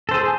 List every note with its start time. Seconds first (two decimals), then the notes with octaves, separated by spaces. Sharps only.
0.09 A4
0.11 C5
0.14 G#4